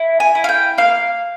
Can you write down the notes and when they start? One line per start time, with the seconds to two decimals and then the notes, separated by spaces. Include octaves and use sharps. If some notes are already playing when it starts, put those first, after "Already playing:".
Already playing: E4
0.20 G#5
0.35 E4
0.44 F5
0.49 G5
0.78 A#3 F5